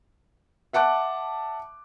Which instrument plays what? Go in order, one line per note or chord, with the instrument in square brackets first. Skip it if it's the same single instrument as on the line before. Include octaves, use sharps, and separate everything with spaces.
[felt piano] E5 F#5 A5 D6 F#6